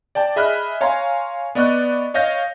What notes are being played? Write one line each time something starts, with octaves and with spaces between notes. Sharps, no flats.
D5 G5 A5
G#4 D#5 E5 B5 F6 F#6
C#5 F5 G#5 A#5 C6
B3 D5 D#5 C#6 F#6
C#5 D#5 F5 G6 A#6